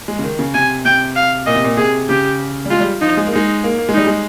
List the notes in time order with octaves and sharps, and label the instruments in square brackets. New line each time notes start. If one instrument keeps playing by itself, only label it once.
[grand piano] G#3
C#3
D#3
C#3
[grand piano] C3 [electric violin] G#5
[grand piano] C3 [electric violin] G5
[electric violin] F5
[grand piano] A#2 [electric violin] D#5
[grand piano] C3
A#2
[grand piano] C3 [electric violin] G#4
[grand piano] C#3 [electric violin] G4
[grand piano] G3
[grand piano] G#3 [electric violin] F4
[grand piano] G3
[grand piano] F3 [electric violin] D#4
[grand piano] G#3
A#3
[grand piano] G#3 [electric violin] D#4
[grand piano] A#3
A#3
G#3
[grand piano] G3 [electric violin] D#4
[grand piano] G#3